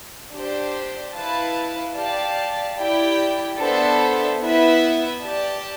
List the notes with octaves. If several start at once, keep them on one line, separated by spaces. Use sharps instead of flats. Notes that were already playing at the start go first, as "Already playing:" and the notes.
D4 G4 C5
E4 B4 F5 A5
G4 D5 F5 A5
E4 G4 D5 G5
B3 D4 A4 C5 E5
B3 E4 B4 E5
G4 D5 A5